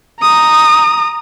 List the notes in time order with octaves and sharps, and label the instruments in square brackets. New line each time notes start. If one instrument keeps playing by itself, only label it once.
[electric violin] A#5 D#6